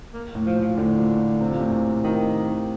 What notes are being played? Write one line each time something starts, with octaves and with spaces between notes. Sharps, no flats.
A#3
A2
F3
A#2
F3
A2 D3
A#2
C3
A#2
A2
A#2
A#2 D#3